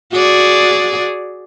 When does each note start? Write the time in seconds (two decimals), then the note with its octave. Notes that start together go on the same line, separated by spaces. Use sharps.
0.13 F#4 G#4 D5